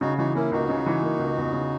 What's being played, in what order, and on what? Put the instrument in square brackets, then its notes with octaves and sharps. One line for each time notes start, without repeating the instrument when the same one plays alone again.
[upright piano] C#3 [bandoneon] D#4 F#4
[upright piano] E3 [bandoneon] D#4 F#4
[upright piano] A#3 [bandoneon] C#4 E4
[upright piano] C#2 [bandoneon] D#4 F#4
[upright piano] C#3
E3
A#3
C#2
E2
C#3